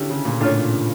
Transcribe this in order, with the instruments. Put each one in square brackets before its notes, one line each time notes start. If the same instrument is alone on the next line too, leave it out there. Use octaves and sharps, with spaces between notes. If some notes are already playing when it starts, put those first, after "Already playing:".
Already playing: [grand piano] D3 [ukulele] C#4 E4 G4
[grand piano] C#3
A#2
[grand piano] A2 [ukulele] D4 F4 C#5
[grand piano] A#2
C#3